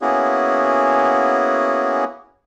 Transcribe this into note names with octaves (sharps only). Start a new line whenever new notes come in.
A#3 B3 C#4 E4 F#4 G#4